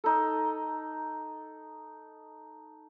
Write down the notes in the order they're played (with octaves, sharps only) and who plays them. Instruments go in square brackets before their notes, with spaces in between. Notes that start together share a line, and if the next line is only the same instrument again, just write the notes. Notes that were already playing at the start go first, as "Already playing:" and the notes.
[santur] D#4 A4